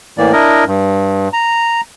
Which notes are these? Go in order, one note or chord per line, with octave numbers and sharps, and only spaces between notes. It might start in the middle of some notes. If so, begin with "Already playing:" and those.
A2 E3 A#3 D5
D4 E4 A#4 D#5
G2
A#5